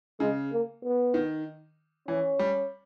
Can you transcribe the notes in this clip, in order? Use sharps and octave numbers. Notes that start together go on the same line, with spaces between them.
C#3 G#3
A#3
B3
D#3
E3 C#4
G3